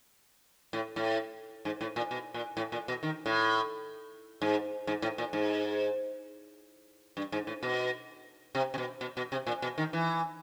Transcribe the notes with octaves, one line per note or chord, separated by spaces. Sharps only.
A2
A2
G#2
A2
A#2
B2
A#2
A2
A#2
B2
D#3
A2
G#2
G#2
A2
A#2
G#2
G2
G#2
A2
B2
C3
C3
B2
B2
B2
C3
A#2
B2
D#3
E3